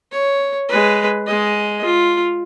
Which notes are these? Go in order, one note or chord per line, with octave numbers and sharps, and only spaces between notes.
C#5
G#3 B4
G#3 D#5
F4